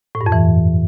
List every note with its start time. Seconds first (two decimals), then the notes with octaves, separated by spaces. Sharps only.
0.15 A2
0.21 G2
0.26 F2
0.32 E3